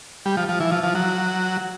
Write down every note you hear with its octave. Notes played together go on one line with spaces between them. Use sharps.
G3
F3
F3
E3
F3
F3
F#3